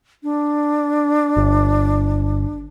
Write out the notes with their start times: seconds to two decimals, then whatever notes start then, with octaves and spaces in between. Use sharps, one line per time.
0.23 D4
1.37 G1